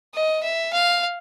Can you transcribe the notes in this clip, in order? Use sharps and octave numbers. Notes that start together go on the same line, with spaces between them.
D#5
E5
F5